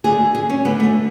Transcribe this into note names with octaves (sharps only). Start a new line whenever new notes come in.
D2 D3 G#4
G#4
C#4
D2 D3 B3
A3